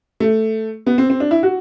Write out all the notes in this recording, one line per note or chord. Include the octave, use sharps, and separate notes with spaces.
A3
B3
C4
C4
D4
E4
F#4